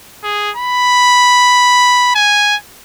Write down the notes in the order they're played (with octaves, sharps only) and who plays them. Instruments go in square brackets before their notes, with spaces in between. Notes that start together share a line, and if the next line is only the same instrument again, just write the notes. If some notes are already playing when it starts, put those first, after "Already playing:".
[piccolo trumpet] G#4
B5
G#5